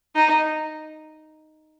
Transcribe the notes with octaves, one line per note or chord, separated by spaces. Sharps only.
D#4